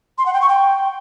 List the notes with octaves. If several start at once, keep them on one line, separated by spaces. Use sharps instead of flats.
C6
F#5
G5
C#6
G5